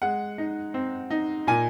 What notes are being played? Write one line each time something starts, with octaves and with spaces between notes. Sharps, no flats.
G#3 F#5
D#4
C4
D#4
A#2 G#5